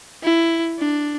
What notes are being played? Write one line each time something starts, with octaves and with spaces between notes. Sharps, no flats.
E4
D4